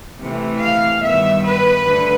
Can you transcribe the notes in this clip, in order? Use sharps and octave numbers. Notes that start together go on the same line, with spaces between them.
C3 E3 A3
F5
G2 D#3 G3 B3 E5
B4
D2 D3